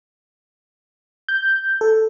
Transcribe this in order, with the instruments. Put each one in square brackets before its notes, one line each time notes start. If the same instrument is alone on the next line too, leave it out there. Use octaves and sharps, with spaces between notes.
[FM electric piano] G6
A4